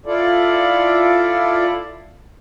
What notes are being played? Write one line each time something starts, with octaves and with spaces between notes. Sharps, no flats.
E4 F4 A4 D5